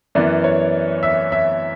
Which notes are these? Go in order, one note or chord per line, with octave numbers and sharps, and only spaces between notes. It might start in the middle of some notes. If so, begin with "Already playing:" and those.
F#2 E3 B3 D5
C#5
E5
E5